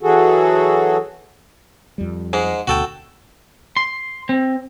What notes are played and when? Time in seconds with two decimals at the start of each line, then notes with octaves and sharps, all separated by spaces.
0.01 E3 F#3 F#4 G#4 A4
1.98 F2 G3
2.33 G#2 G#3
2.67 D2 B2 F#4 A4 G5
3.77 C6
4.29 C4